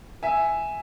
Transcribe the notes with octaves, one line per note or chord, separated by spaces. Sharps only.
E5 G#5